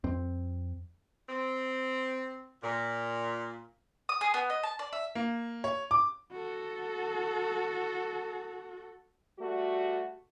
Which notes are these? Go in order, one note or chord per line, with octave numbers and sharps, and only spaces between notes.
F2 C4
C4
A#2
D#6
G#4
B3
D#5
A5
D5
E5
A#3
C#5
D6
F#4 A4
G3 A3 F#4